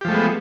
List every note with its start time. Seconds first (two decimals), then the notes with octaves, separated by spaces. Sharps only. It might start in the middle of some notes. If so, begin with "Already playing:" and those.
0.01 G4
0.05 F3
0.08 A3
0.11 G#3
0.15 B3